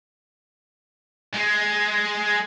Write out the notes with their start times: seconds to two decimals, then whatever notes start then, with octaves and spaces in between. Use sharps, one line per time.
1.34 G#3